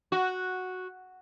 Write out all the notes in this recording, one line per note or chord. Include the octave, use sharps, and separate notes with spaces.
F#4